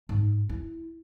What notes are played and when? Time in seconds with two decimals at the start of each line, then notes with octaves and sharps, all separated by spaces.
0.09 G#2
0.49 E4